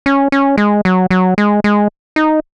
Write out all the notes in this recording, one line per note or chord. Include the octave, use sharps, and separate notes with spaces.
C#4
C#4
G#3
F#3
F#3
G#3
G#3
D#4